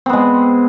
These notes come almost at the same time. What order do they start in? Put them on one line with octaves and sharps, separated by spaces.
C4 B3 G#3